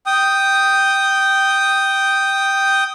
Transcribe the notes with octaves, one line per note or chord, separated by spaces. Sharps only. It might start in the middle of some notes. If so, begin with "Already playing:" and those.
G5 D#6